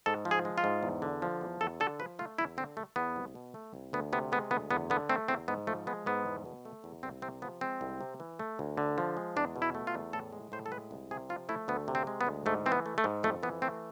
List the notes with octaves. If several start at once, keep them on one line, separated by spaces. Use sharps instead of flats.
G#2 A4
F3
G#4
G#3
F4
G#2
E2
D3
F3
E2
E2 A4
D3 A4
F3 B4
A3 F4
E2 E4
D3 C4
A3
E2 B3
C2
B2
A3
C2
D2 B3
C3 B3
G#3 B3
D2 B3
E2 B3
D3 B3
A3 C4
E2 C4
G#2 B3
F3 A3
G#3 B3
G#2 B3
E2
B2
A3
E2
C2 C4
C3 C4
F3 B3
G#3 C4
C2
C3
E3
A3
D2
D3
F3
G#3
E2 D4
B2
E4
A3
F4
E2
A2 A4
G#3
A2 C5
A4
G#3 B4
C2
C3 G#4
F3 F4
A3 E4
D2 B3
C3
C4
G#3
B3
D2
G#2 A3
E3 C4
B3
A3
A3
G#2
F2 A3
E3 B3
A3 C4